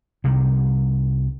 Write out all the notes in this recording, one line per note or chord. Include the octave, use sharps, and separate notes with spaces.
C2 C3 D#3 G3